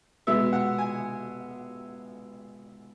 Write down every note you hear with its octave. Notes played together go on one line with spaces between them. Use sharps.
B2 G#3 B3 E5
F#5
G#5